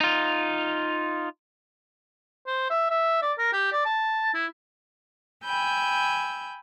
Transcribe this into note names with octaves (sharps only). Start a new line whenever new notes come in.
D#4 F4
C5
E5
E5
D5
A#4
G4
D5
A5
E4
G5 G#5 B5 E6 G6